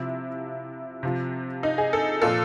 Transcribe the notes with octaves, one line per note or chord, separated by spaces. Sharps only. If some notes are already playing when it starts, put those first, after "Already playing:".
Already playing: C3 F3 E4
C3 F3
D#4
G#4
A4
A#2 F3 A4